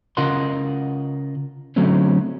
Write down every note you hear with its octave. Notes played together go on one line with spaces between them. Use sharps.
C#3 F4 A#4 D#5 F#5 C6
D3 F#3 A3 C4 C#4